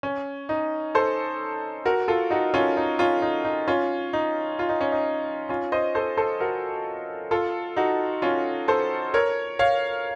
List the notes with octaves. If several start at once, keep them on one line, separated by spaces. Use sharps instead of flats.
C#4
D#4
A4 C5
F#4 A#4
F4 A4
D#4 F#4
C#4 F4
D#4
C#4 F4
D#4
D#4
C#4 F4
D#4
F4
D#4
C#4
D#4
C#4 F4
C5 D#5
A4 C5
A4 C5
F#4 A#4
F4 A4
D#4 F#4
C#4 F4
A4 C5
A#4 C#5
C#5 F5